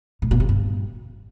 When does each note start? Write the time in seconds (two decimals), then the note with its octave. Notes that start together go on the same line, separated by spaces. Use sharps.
0.22 A2
0.31 A#2
0.40 C3
0.49 G2